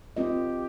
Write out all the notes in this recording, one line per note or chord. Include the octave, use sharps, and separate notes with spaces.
C4 F4 G4 A#4 D#5